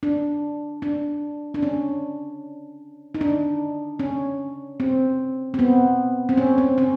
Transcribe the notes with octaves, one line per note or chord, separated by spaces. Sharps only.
D4
D4
D4
C#4
D#4
D4
C#4
C4
C4
B3
C4
C#4
C4
C#4